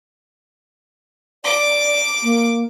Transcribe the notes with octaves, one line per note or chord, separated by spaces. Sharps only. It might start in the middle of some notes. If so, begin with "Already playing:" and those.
D5 D6
A#3